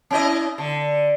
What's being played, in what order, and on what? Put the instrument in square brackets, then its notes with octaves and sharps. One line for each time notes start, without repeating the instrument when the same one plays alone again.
[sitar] C#4 E4 D#5
D3